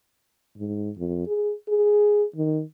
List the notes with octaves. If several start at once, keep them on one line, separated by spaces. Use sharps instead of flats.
G#2
F2
G#4
G#4
D#3